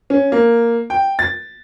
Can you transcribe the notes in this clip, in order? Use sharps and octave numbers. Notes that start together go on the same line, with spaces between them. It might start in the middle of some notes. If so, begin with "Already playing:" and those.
C#4
A#3
G5
A6